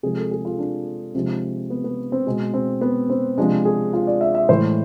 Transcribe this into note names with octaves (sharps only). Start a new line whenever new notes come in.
C3 F3 G#3 G#4
A4
G#4
F4
D4
C3 F3 G#3
B3
B3
C4
B2 G#3
C4
B3
C4
C3 F3 G#3 D4
G#4
F4
D5
E5
E5
A2 E3 G#3 C5